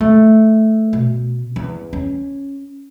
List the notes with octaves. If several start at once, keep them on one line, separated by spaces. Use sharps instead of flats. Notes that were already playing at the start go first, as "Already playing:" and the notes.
A3
B2
E2
C#4